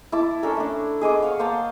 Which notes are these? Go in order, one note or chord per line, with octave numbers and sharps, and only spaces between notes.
E4 A5 D6
C#4 D4 A4 A#4
A3 D4
G#4 D#5 G#5 D6
C#5 F5 F#5
A#3 C5 G#5 A5